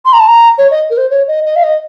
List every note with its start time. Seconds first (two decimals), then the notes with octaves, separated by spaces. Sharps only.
0.05 C6
0.13 A#5
0.20 A5
0.28 A#5
0.58 C#5
0.71 D#5
0.90 A#4
0.97 C5
1.10 C#5
1.28 D#5
1.45 D#5
1.56 F5
1.63 D#5